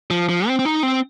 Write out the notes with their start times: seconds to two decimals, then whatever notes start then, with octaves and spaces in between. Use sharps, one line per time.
0.11 F3
0.29 F3
0.48 C4
0.59 C4
0.65 D#4
0.83 C4